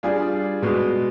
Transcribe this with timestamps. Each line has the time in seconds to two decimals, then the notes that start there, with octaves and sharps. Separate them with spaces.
0.03 G3 D4 F4 G#4
0.62 B2 G#3 B3